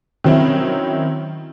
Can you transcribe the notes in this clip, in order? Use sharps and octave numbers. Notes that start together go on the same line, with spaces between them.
D#3 F#3 C4 C#4 E4